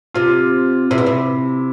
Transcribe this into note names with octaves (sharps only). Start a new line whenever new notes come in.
C3 F4
C3 E4
B2
C3